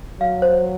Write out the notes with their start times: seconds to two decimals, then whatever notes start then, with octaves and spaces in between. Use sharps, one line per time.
0.20 F#3 F5
0.42 C5